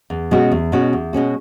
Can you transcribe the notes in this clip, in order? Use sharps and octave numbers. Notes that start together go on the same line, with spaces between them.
E2
B2 G#3 C#4 F#4
E2
B2 G#3 C#4 F#4
E2
B2 G#3 C#4 F#4